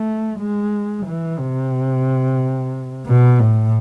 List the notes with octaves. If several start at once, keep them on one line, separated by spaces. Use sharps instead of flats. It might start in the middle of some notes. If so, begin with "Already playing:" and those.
Already playing: A3
G#3
E3
C3
B2
A2